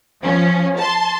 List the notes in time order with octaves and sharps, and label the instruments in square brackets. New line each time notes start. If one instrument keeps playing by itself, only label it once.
[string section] F3 C#4
A5 C6